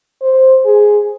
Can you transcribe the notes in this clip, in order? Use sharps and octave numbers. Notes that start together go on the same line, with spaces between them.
C5
G#4